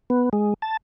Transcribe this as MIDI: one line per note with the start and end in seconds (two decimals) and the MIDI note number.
0.10 0.29 59
0.33 0.54 56
0.62 0.77 81